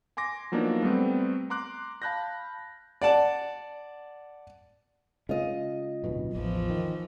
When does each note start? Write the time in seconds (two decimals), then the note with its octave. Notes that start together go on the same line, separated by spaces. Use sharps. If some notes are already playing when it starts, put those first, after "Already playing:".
0.17 G#5 C6 D6 A#6
0.52 F3 F#3 A#3 B3 D4 D#4
0.83 G3 A3 B3 C4
1.50 A#5 C6 D6 F#6
2.02 F5 A5 B5 F#6 G6 A#6
3.02 D5 F#5 A5
5.29 C#3 G#3 F4 D#5
6.04 D1 B1 B2
6.35 A1 E2 E3 F3
6.70 D#3